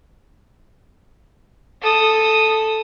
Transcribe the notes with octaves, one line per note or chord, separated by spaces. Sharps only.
A4 D#6